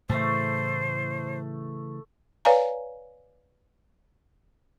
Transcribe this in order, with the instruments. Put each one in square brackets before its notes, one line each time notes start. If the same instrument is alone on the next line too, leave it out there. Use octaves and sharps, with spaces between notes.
[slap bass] A2 C#3 E3 [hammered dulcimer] A3 A4 [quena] C5
[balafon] B4 C#5 D5 F5 G#5 A#5